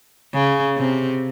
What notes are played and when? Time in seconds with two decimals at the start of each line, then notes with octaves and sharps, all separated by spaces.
0.34 C#3
0.77 C3